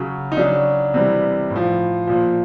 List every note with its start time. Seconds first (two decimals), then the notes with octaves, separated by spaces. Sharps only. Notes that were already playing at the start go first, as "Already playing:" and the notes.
Already playing: C#3 F#3
0.32 D#4
0.37 C#3 F#3 D4
0.94 C3 E3 G3
1.50 A2
1.56 F3
2.07 A#2 F3